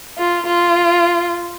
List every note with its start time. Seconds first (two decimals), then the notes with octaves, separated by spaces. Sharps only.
0.18 F4
0.46 F4